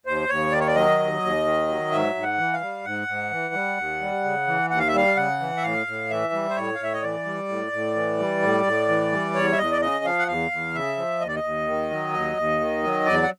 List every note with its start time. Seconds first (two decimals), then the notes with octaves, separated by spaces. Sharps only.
0.06 D#2 C5
0.29 D#2 C#5
0.52 D#3 D5
0.60 C#5
0.67 D5
0.75 F#3 D#5
0.99 D#2
1.22 D#2
1.45 D#3
1.68 F#3
1.92 G#2 E5
2.15 G#2
2.23 F#5
2.38 E3
2.53 F5
2.61 G3
2.84 G#2 F#5
3.08 G#2
3.31 E3
3.54 G3
3.77 D#2
4.01 G3
4.24 C#3
4.47 E3
4.70 D#2 F#5
4.79 F5
4.88 E5
4.94 G3 F5
5.17 C#3 F#5
5.40 E3
5.57 E5
5.63 A2 F5
5.87 A2
6.10 E3 E5
6.33 G3
6.50 C5
6.56 A2 C#5
6.75 F5
6.79 A2 E5
6.94 D#5
7.03 E3 D5
7.25 G3
7.49 A2
7.72 A2
7.95 E3
8.19 G3
8.42 A2
8.65 A2
8.89 E3
9.12 G3
9.35 E2 C#5
9.52 E5
9.58 E2 D#5
9.72 D5
9.82 C#3 D#5
10.04 F3 F5
10.19 F#5
10.28 E2 F5
10.51 E2
10.74 C#3 E5
10.97 F3
11.20 D#2 D#5
11.28 D5
11.36 D#5
11.44 D#2
11.67 D#3
11.90 F#3
12.13 D#2
12.37 D#2
12.60 D#3
12.84 F#3
13.06 E2 D5
13.23 F#5